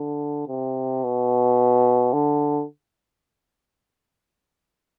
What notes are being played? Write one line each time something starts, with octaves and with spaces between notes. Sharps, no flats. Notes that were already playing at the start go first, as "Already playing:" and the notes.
Already playing: D3
C3
B2
D3